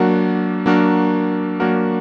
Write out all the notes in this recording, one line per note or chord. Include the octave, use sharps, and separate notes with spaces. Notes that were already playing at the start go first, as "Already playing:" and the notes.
Already playing: F#3 A#3 D4 F#4 A#4
F#3 A#3 D4 F#4 A#4
F#3 A#3 D4 F#4 A#4